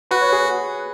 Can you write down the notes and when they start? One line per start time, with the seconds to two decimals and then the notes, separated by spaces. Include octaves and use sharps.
0.11 F#4 B4
0.21 C#5
0.32 G#4 B4